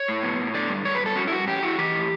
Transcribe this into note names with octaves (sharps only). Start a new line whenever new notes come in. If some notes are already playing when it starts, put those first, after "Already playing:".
Already playing: C#5
A2
B3
A2
D3 D5
G2
G2 C#5
B4
G2
A4
C#4 F#4
E4
G2 F#4
C#4 G4
E4 F#4
E3 G4
A2